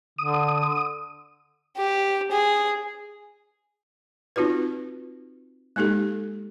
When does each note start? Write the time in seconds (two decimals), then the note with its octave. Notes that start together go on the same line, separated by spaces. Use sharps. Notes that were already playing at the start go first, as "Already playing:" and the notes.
0.18 D3 D#6
1.77 G4
2.32 G#4
4.36 C4 D#4 F4 F#4 B4
5.76 G#3 A#3 D#4 G4 A4